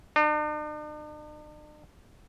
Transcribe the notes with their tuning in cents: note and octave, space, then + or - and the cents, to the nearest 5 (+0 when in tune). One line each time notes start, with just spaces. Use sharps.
D4 +45